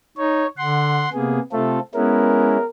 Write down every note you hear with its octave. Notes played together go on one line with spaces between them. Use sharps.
D#4 C#5
D3 F#5 C6
C3 A#3 B3 G#4
C3 A3 C4 F4 A4
G#3 B3 C#4 E4 A#4